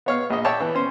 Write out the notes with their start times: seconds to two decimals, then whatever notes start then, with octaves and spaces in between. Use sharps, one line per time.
0.06 B3 C#5 F5
0.30 A#1 D#5
0.45 C#5 D5 E5 G5 A5
0.60 E3
0.75 C#4 C5